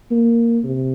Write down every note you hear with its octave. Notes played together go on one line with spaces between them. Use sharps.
A#3
C3